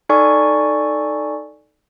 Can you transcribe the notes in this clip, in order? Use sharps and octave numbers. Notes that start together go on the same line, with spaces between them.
D#4 A4 D5 G#5 C#6